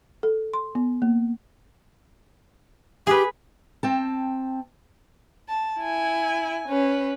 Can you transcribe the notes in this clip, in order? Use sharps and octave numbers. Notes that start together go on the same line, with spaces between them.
A4
C6
B3
A#3
G4 G#4 B4
C4 G5 A5
A5
E4 G#5
C#4 B4